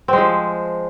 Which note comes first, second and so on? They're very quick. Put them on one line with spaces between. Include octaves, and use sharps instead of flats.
C4 G#3 F3